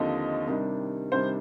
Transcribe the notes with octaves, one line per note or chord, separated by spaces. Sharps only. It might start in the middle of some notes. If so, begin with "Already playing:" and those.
Already playing: D#2 D3 F3 C4 D#4 D#5
C3 D#3 G3 D4
C3 D#3 G3 D4 C5